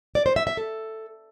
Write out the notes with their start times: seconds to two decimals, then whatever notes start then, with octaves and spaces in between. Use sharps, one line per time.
0.15 D5
0.26 C5
0.36 E5
0.47 E5
0.57 A4